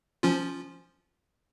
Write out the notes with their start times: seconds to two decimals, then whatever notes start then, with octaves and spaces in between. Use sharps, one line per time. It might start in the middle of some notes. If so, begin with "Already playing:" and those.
0.23 F3 C#4 F4